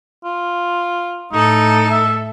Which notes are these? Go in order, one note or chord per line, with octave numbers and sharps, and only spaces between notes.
F4
A2 D#4 A4
E5